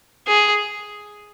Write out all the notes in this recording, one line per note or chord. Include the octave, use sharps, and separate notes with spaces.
G#4